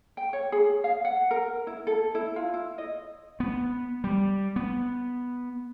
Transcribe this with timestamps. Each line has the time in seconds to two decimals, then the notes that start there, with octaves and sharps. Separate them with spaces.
0.17 G5
0.33 C#5
0.52 G#4
0.84 F5
1.05 F#5
1.31 A#4
1.67 E4
1.87 A4
2.15 E4
2.36 F4
2.54 E4
2.78 D#5
3.40 B3
4.04 G3
4.56 B3